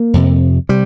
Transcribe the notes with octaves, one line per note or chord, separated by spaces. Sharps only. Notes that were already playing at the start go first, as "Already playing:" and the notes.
Already playing: A#3
F2 C3
C3 G3